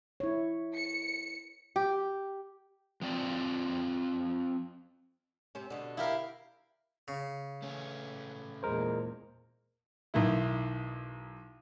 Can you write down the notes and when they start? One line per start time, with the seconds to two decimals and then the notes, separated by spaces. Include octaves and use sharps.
0.20 E4 C#5
0.77 C#7
1.76 G4
3.02 F3 C4 D5
5.55 C3 C4 C#4
5.70 B2 D3
5.97 E4 G4 A#4 F5
7.08 C#3
7.62 A3 C#4
8.63 E2 A#2 G#3 A#4 C5
10.14 B1 D#3 E4